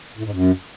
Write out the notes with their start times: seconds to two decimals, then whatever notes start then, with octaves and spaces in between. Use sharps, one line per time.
0.18 A2
0.25 G#2
0.32 F#2